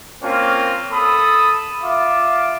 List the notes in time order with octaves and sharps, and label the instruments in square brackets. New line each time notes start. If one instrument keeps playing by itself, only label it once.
[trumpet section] A#3 C4 C#4 F4
A4 B5 D#6
F4 E5 D6